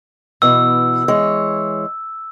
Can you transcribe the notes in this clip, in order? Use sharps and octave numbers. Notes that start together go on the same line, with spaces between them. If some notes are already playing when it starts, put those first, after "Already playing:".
B2 E3 E6
E3 G#3 C#5